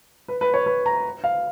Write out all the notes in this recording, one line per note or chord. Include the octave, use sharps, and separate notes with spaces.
B4
B4
C#5
B4
A#5
F5